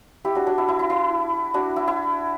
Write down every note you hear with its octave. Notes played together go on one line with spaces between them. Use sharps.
E4 G4
D4 F#4
D4 F#4
E4
E4
E4
E4
D4 F#4
E4
E4